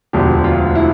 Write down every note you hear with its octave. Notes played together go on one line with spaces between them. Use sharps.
E1 D2 D3 F3 G4
F4
E4